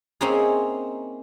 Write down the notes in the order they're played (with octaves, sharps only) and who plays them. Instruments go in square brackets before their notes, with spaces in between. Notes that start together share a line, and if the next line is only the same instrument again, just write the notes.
[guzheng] A#3 C4 C#4 D#4 E4 G#4